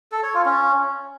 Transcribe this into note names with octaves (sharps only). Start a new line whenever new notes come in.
A4
C#5
F4
C#4